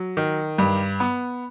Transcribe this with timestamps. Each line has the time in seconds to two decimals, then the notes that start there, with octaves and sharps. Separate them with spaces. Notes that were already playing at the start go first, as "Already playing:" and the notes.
Already playing: F#3
0.17 D#3
0.58 G2
1.00 B3